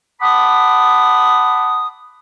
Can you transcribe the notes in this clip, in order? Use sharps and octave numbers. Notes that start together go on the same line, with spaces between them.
F#5 A5 B5 D6 D#6